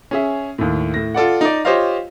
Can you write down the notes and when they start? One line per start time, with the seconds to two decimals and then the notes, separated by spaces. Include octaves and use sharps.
0.11 C#4 G#4 E5
0.58 D#2 A2
0.94 A2 A#6
1.14 F4 A4 D5 F#5
1.41 D#4 D5
1.65 F4 G4 C5 C#5 D#5 F5